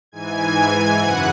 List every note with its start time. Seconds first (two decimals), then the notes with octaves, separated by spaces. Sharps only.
0.12 G#2 E3 G#5 G#6
0.98 F#2 C#3 E3 F#5 F#6